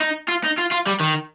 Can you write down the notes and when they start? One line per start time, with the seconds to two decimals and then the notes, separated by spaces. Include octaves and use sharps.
0.01 D#4
0.28 F4
0.44 D#4
0.58 F4
0.71 F4
0.86 G3
1.00 D#3